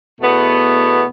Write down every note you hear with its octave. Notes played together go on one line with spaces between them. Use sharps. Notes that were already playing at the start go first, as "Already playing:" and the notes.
E2 B2 A3 B3